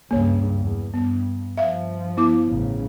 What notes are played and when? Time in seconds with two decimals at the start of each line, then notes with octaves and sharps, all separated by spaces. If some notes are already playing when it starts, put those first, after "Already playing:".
0.11 C#2 G2 A#3 C#5
0.57 E2
0.94 G2 B3
1.57 G2 F3 E5 F5
2.17 B3 E4 D6
2.49 A1 C#3